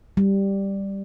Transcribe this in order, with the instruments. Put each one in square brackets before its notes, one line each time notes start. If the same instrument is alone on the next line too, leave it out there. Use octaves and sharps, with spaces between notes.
[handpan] G3